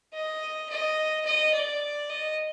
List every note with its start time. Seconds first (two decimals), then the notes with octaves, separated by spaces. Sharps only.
0.13 D#5
0.69 D#5
1.25 D#5
1.54 D5
2.10 D#5